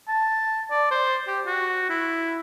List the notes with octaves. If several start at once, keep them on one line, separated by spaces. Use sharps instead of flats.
A5
D5
C5
G4
F#4
E4